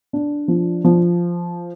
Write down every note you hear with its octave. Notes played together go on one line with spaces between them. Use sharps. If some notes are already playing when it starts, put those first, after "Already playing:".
D4
F3
F3